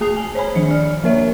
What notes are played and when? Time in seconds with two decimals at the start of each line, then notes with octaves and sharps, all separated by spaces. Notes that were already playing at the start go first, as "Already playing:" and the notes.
0.01 A3 G#4 A5 D#6 C7 F7
0.17 G#5
0.35 C5 C#5 G#5 B5
0.55 D#3 F3 C#7
0.71 D5 F6
1.04 F3 A#3 A#4 C#5 E5